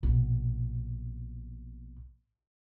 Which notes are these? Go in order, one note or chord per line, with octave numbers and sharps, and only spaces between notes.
A#1 B2